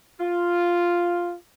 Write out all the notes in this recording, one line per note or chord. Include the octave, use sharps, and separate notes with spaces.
F4